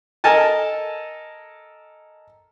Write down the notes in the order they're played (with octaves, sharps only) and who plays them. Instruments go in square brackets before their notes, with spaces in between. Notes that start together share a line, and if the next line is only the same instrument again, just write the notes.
[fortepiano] A4 A#4 D#5 G#5 A5